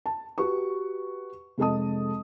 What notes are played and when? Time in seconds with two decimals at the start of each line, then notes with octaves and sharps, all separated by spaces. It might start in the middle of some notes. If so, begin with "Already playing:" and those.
0.06 A5
0.38 F#4 G4 B4 C#6
1.58 F1 G#3 A4 D#5 A5 D#6